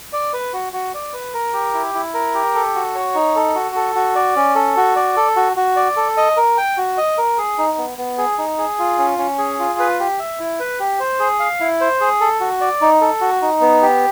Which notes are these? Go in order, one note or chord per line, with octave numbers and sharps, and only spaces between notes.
D5
B4
F#4
F#4
D5
B4
A#4
G4
E4
E4
A#4
G4
A4
F#4
C#5
D#4
A4
F#4
A4
F#4
D5
C#4
A4
F#4
D5
A4
F#4
F#4
D5
A4
D#5
A#4
G5
F#4
D#5
A#4
G#4
D#4
B3
B3
G#4
D#4
G#4
F4
C#4
C#4
G#4
F4
B4
G4
E5
E4
B4
G4
C5
G#4
F5
E4
C5
G#4
A4
F#4
D5
D#4
A4
F#4
D#4
B3
G4